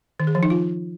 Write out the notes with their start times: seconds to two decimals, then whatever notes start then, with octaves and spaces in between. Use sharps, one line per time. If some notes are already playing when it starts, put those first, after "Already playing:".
0.20 D#3
0.27 G#4
0.35 F3
0.43 D#4
0.50 F4